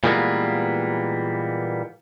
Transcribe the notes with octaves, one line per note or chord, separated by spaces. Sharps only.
A#2 E3 G3 G#3 A#3 B3